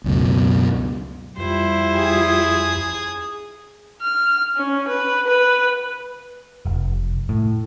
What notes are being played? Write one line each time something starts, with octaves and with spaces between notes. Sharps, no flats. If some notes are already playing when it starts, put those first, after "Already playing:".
C#2 F#2 B2
F2 G3 E4 F4 C5
G#4 D#6
F6
C#4
B4
B4
F1
A2